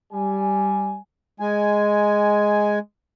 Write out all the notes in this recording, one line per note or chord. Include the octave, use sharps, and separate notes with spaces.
G3 G#5
G#3 G#5